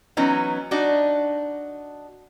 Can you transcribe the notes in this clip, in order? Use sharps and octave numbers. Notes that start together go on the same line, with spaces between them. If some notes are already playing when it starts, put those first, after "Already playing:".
E3 F#3 B3 C#4 D#4
D4 D#4 F#4